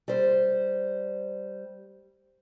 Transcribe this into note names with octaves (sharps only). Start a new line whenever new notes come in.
G3 C5